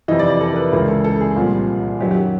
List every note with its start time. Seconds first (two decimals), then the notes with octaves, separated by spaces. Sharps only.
0.08 F2 C3 E3 D#5
0.19 D5
0.30 D5
0.41 A4
0.52 A#4
0.56 B4
0.72 C#2 C#3 E3 A#4
0.88 A4
1.04 A4
1.21 G#4
1.36 C2 A#2 F3
2.00 F#2 D#3 F#3 G4
2.11 G4
2.21 G4